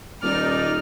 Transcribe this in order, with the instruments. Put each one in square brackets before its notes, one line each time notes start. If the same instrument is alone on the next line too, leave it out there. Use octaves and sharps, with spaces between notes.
[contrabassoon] D#1 [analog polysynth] D#4 D5 [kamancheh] F6